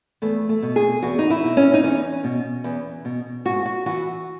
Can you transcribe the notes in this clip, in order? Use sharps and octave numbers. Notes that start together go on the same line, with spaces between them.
E2 A3
A3
B2
G#4
E2 F#4
D#4
E4
B2
C#4
D#4
E2 C#4
B2
E2
B2
G#2 F#4
F#4
E3 F#4